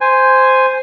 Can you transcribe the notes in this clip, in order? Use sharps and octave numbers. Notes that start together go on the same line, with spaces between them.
C5 G#5